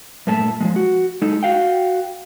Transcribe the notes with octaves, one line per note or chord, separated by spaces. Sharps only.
G2 A#2 A3 A5
F3 G3 G#3
F#4
G#3 D#4 A4
F#4 F5 G5